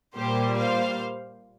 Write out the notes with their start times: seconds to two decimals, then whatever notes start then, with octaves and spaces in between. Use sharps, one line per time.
0.16 A#2 G3 A#3 G4 C5
0.58 C5 F5